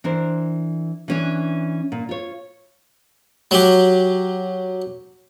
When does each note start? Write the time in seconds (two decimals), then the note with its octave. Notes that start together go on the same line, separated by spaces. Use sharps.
0.04 E3 D4 A#4 C5
1.08 E3 C#4 D4
1.92 A#2
2.09 F4 C#5
3.51 F#3 G4